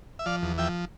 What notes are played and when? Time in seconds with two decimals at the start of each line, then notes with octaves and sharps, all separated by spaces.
0.19 E5
0.26 F3 D5 F5
0.42 E2
0.58 F3 E5 G5